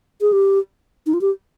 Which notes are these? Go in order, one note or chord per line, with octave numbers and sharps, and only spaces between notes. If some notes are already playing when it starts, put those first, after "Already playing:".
G#4
G4
D#4
F4
G4